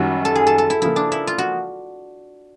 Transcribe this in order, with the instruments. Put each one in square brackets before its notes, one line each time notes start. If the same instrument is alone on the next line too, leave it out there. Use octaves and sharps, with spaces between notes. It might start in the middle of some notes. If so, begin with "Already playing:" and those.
Already playing: [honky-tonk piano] F#2 D#3 G3 [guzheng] F#4
[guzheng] A4
G#4
A4
A4
E4
[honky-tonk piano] C#3 F3 A#3 [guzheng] E4
[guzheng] D4
E4
F4
F#4